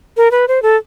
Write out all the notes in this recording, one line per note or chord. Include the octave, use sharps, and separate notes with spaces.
A#4
B4
C5
A4